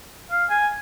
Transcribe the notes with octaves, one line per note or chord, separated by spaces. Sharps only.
F5
G#5